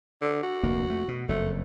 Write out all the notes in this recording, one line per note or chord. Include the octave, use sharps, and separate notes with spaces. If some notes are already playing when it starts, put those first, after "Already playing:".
D3
F#4
F1 D2 A#3
F2 A3
B2
F#1 F2 A3